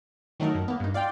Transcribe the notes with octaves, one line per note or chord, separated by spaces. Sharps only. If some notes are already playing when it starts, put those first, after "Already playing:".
D#3 F#3 A3 D#4 A#4
F#2
A#3 B3
G2 D#4
F4 D5 F5 G5